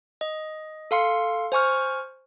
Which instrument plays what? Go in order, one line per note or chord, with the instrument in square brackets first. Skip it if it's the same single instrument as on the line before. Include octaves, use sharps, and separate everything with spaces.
[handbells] D#5
A4 F5 C6 C#7
C5 G#5 C#6 F6